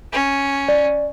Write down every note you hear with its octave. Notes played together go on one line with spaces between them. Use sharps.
C#4
D5